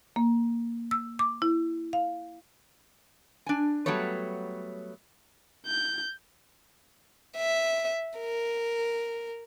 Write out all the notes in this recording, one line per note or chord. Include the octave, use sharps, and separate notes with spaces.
A#3
E6
D6
E4
F5
D4 G#5
F#3 G3 A3 B3 C#5
G6
E5
A#4